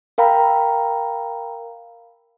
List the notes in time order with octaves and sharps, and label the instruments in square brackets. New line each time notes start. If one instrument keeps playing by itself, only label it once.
[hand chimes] A#4 F5 G5 A#5 B5